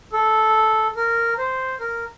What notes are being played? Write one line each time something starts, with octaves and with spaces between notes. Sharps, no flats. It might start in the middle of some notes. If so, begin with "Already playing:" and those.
A4
A#4
C5
A#4